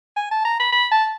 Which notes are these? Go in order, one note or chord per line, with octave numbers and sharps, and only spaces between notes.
G#5
A5
A#5
B5
B5
A5